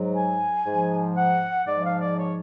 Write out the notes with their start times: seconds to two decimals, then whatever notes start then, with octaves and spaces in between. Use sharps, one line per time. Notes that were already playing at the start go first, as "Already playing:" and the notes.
Already playing: G#2 F#3
0.16 G#5
0.66 G#2 F3
1.17 F#5
1.67 G#2 F3 D5
1.85 F5
2.01 D5
2.18 C#5